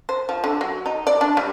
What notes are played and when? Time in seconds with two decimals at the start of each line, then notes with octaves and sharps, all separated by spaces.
0.09 C5
0.29 F3
0.44 D3
0.61 F#3
0.86 D#4
1.07 D5
1.21 D4
1.37 G3